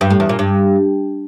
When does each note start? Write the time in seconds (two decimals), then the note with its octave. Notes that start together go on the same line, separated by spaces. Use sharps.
0.01 G2
0.10 A2
0.20 E2
0.29 A#2
0.39 G2